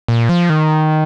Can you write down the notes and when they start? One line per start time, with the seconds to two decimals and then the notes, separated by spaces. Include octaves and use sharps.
0.08 A#2
0.29 F3
0.50 D#3